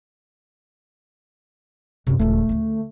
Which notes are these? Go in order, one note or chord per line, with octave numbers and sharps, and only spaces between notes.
F#2 C3 C#4
D#1 C#2 A3
D2 C#3